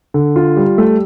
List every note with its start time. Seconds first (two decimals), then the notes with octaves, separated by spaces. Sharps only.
0.14 D3
0.36 F4
0.57 G3
0.78 A3